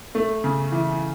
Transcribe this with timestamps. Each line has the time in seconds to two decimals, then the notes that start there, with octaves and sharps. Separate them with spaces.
0.15 A3
0.44 C#3
0.72 E3